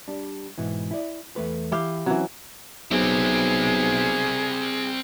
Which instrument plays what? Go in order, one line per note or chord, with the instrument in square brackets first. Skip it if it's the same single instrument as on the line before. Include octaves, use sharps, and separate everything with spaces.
[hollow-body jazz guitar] G3 D4
G#2 B2 E3
E4 D5
E2 A3 B4
[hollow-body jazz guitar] E3 [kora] E4 G4 F5
[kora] E3 F#3 [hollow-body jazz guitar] C4 C#4
[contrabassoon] B1 [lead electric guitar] C4 E4 [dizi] G#4